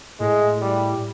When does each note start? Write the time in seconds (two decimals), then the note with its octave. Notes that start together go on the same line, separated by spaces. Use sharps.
0.20 A2 G#3
0.62 G3